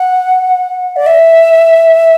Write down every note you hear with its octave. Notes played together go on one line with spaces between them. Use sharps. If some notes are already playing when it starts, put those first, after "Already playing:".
Already playing: F#5
D5
E5